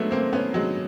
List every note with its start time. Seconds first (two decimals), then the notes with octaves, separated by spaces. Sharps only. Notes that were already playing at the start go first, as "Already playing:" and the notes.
Already playing: F#3 G#3 A3 B3
0.11 A#3 C4
0.33 B3 C#4
0.54 F#3 G#3